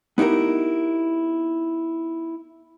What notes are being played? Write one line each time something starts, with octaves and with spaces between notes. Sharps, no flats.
B3 D#4 E4 G4 A#4